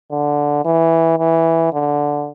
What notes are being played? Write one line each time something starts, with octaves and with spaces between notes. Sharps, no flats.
D3
E3
E3
D3